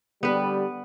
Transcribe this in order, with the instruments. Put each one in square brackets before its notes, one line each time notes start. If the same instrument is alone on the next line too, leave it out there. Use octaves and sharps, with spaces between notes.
[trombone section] D3 G3 [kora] B3 B4